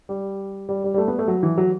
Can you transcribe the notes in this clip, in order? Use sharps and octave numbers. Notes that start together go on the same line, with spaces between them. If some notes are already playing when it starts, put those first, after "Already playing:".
G3
G3
G3
G3
A3
B3
A3
F#3
E3
F#3